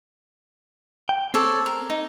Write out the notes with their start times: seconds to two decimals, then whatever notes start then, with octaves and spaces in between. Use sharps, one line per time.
1.09 G5
1.34 C4 A4 C#5 D5
1.66 A#4
1.90 D#4